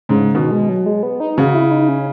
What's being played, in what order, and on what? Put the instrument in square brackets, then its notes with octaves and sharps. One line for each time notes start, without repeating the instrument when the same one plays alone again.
[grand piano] G#2 [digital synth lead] C#3
[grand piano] B2 [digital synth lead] D#3
[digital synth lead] G#3
F#3
G#3
B3
D#4
[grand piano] C#3 [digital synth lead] F#4
[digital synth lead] E4
D#4
C#4